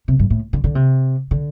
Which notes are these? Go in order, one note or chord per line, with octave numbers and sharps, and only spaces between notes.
C3
G2
A2
D3
D3
C3
D3